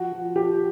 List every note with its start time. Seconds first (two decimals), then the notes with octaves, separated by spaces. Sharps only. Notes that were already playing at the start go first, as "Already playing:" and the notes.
Already playing: F3 F#4
0.12 F3
0.35 F3 G4